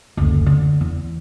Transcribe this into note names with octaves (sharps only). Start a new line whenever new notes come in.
F#1 D2
D3
E2